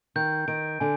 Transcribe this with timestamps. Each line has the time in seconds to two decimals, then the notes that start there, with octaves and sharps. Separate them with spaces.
0.16 D#3 G6
0.48 D#3 D7
0.80 D3 G#5